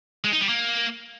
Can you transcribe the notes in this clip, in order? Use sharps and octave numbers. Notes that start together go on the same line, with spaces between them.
G#3
D#4
G3
A#3